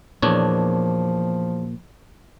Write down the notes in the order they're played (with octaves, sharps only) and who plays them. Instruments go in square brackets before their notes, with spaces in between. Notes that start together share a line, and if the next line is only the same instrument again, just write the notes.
[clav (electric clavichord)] E2 D4 C#5 [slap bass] A#2 [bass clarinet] F3